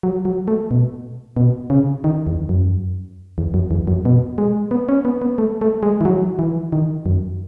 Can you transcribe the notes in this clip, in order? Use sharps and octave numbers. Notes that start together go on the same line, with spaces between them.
F#3
F#3
A3
B2
B2
C#3
D#3
E2
F#2
E2
F#2
E2
F#2
B2
G#3
B3
C#4
B3
B3
A3
A3
G#3
E3
F#3
E3
D#3
F#2